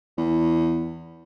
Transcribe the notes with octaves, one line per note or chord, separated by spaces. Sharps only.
E2